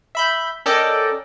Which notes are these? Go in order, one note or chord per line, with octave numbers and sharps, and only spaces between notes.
E5 B5 G6
C#4 A4 A#4 D5 D#5 G5